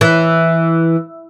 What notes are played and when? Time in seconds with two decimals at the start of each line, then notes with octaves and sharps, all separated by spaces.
0.01 E3